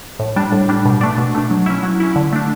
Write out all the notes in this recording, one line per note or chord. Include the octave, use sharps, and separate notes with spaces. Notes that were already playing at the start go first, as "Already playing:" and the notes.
A2
G3 D4
A2
G3 D4
B2
A3 D4
B2
A3 D4
F#3
C#4 E4
F#3
C#4 E4
D3
A3 D4